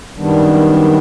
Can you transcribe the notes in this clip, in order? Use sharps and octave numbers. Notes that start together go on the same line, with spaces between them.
F#2 D#3 G3 B3 D4